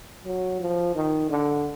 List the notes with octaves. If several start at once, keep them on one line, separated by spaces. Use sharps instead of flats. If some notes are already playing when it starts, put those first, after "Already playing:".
F#3
F3
D#3
D3